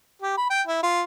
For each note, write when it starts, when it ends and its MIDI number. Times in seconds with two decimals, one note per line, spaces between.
0.22 0.35 67
0.37 0.48 83
0.50 0.62 79
0.67 0.81 64
0.83 1.02 65